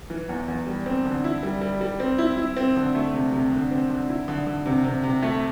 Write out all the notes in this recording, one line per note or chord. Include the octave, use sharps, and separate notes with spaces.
E3
E2
E2
G3
C4
D3
E4
G3
G3
G3
C4
E4
E4
C4
D3
A3
C3
C3
D3
C4
D3
E4
D3
D3
C3
C3
C3
A3